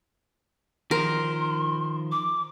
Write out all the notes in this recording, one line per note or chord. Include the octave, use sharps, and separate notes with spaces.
D#3 F3 A#4 C6
D6